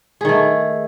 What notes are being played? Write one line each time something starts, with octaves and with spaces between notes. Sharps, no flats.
D#3 A3 G#4